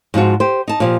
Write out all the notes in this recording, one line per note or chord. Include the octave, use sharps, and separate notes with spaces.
G#2 F3 F4 F#4
G4 C5
D#4 A5
A#2 F3 G4